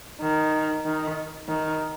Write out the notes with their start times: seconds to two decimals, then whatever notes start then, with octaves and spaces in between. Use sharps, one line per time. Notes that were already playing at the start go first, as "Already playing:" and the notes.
0.21 D#3
0.85 D#3
1.48 D#3